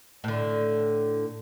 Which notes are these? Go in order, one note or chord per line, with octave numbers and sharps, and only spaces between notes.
A2 D3